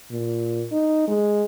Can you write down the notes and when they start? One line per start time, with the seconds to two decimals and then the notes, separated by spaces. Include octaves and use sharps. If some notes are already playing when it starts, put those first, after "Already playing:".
0.11 A#2
0.72 D#4
1.08 G#3